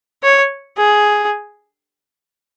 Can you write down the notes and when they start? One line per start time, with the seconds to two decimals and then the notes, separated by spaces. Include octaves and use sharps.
0.23 C#5
0.78 G#4